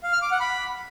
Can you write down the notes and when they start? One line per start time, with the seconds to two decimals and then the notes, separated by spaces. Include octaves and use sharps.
0.03 F5
0.13 F6
0.22 D6
0.31 F#5
0.40 B5